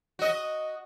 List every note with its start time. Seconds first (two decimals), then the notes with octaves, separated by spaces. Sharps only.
0.19 F#4 D#5